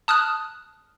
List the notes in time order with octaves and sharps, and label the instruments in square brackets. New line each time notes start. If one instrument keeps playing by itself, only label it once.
[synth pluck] A5 D#6 F6 F#6